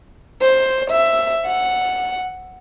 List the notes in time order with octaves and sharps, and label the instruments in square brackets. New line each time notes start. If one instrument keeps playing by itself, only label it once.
[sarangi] C5
E5
F#5